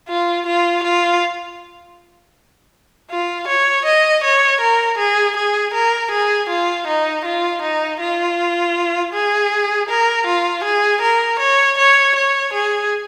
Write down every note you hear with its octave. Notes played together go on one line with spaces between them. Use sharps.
F4
F4
F4
F4
C#5
D#5
C#5
A#4
G#4
G#4
A#4
G#4
F4
D#4
F4
D#4
F4
G#4
A#4
F4
G#4
A#4
C#5
C#5
C#5
G#4